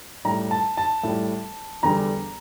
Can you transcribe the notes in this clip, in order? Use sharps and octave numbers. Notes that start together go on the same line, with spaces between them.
A2 G3 A#5
A5
A5
A2 G3
E2 D3 G3 A#5